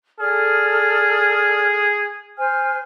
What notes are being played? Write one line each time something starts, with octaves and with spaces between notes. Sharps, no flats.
G#4 A4 D5 F6
C5 G#5 F6